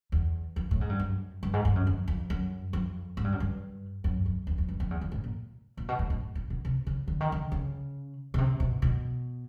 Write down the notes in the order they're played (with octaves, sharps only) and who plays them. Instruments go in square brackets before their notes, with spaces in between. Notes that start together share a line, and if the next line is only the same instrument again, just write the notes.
[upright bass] E2
F2
A2
G#2
G2
F#2
G2
G#2
G2
F#2
F2
F2
F#2
F2
G#2
G2
F#2
G2
F#2
F2
E2
F2
G2
F2
E2
F2
G#2
A#2
A#2
B2
A2
A2
A#2
B2
C3
C#3
D3
D#3
D3
C#3
B2
C3
B2
B2